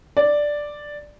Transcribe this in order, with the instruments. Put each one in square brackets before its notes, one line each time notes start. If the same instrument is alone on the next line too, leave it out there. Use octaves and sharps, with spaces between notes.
[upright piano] D5